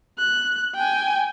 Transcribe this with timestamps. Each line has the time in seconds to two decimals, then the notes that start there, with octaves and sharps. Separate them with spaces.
0.18 F#6
0.75 G5 G#5